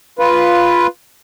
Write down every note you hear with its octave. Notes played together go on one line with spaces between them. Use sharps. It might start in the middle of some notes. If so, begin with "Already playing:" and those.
F4 B4